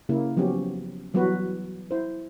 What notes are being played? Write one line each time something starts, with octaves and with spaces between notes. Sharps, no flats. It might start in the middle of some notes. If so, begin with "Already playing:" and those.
C#3 A#3 E4
F3 F#3 B3 C#4 G4
E3 F#3 G3 B3 F#4 B4
E4 C5